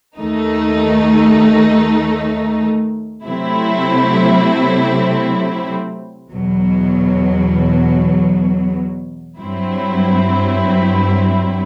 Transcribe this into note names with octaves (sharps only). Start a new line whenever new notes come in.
D#2 D#3 A3 D#4
C3 F#3 A3 C4 E4
E2 B2 F#3
G2 F#3 C4 E4